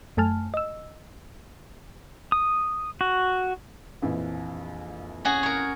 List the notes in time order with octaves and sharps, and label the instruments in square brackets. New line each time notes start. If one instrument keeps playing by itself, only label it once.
[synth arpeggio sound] F#2 A3 G#5 A5 F6
D#5 E6
[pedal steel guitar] D#6
F#4
[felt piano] A#1 F2 E3
[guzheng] C#4 F#4 G#4
A#4 C#5